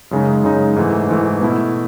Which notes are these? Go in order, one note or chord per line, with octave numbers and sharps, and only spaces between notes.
F#2 C#3 G#3 D#4
F#2 C#3 G#3 D#4
G#2 E3 A3
G#2 E3 A3
B2 A3 E4